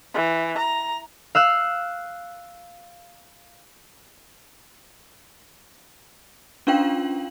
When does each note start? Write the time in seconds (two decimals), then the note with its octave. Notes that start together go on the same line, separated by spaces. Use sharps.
0.15 E3
0.58 A#5
1.35 F5 E6 F#6
6.67 C#4 D4 F4 F5 G5 F#7